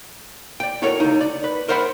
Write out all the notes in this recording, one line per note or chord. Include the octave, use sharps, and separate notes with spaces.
D5 G5
E4 F#4 A4 A#4 C#5
C#2 D#4
D5
B4
A#4 C5 E5 F#5 A5 B5